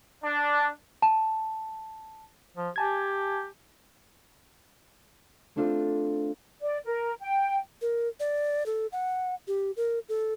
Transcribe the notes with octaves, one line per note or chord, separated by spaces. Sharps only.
D4
A5
F3
G4 G#5 A5 G#6
A3 C4 D4 F4 A4
D5
A#4
G5
A#4
D5
A4
F#5
G4
A#4
A4